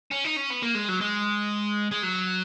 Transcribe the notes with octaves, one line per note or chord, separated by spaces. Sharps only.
C#4
D#4
C#4
B3
A#3
G#3
F#3
G#3
G#3
F#3